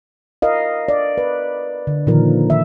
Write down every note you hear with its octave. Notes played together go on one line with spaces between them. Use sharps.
A#4 D#5 F5
D5
B4
D3
A#2 D3 D#3 F3 A#4
D#3 E5